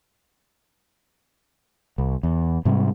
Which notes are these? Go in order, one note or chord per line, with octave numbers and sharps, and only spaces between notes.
C2
E2
G#2 C3 G3